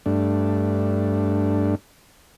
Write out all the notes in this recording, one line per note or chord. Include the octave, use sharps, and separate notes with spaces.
G2 A3 D4